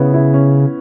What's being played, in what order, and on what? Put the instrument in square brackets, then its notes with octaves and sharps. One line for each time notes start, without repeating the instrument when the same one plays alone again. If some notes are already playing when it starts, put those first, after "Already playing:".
Already playing: [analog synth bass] C#3 [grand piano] B3 E4
[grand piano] E4
C#4